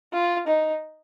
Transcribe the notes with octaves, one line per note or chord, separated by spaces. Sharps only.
F4
D#4